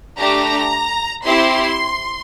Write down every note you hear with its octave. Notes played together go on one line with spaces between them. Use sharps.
A3 D4 G4 A#5
C4 E4 G4 C6